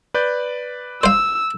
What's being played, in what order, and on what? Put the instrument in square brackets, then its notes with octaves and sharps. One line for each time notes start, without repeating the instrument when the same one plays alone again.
[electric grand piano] B4 D5 G6
[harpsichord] C5 F5 [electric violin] E6